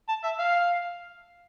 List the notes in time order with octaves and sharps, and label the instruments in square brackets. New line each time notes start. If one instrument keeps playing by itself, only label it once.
[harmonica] A5
E5
F5